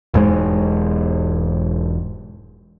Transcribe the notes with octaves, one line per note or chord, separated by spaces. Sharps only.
E1 G#2 G#3